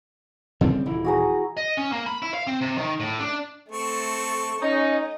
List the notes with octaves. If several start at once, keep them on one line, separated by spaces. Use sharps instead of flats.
C#3 G3 C4
D#1 E3 E4
F#4 G#4 A#5
D#5
C#4
A#3
B5
E4
F5
C4
C3
D#3
A2
D4
A3 C4 A4 C#6
C#4 D#4 D#5